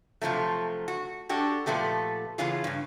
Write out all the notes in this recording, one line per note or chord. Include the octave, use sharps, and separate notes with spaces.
C3 F3 F#3 A3
F#4
D4 F#4 G4 A4
A#2 F3 A3 B3 G4
C#3 E3 B3 C#4 F4 G#4
G2 C#3